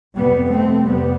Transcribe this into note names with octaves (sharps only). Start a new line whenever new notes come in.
F2 C3 G3 B3
A3 C4
F2 C3 G3 B3